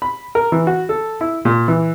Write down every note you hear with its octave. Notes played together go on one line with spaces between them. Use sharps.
B5
A#4
E3
F#4
A4
E4
A#2
E3